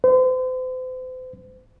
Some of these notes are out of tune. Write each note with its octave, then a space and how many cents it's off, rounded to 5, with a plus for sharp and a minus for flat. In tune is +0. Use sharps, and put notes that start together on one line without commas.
C5 -40